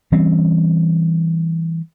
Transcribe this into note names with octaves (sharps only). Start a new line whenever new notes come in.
E3 G3 C4 C#4